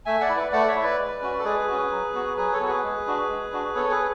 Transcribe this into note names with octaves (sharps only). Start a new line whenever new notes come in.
A3 E5 G#5
D5 F#5
E4
B4 D5
A3 D5 F#5
C#5 E5
E4
B4 D5
G#3
C#4 F#4
A4
G#3 G#4 B4
C#4 F#4
F#3
B3 F#4
F#3 G#4 B4
A4 C#5
B3 F#4
G#4 B4
G#3
D4 F#4
G#3
D4 F#4
B3 A4 C#5
G#4 B4